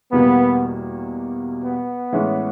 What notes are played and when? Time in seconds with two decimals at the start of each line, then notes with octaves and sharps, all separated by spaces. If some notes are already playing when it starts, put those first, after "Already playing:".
0.12 E2 B2 G3 A#3 B3
1.63 B3
2.12 A2 E3 G#3 C#4